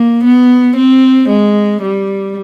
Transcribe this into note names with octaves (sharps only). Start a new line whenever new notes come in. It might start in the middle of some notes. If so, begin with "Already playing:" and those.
Already playing: A#3
B3
C4
G#3
G3